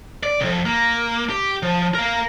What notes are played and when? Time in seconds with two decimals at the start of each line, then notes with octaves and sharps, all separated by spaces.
0.23 D5
0.41 C2 F2
0.66 A#3
1.29 G4
1.63 F3
1.95 A#4 F5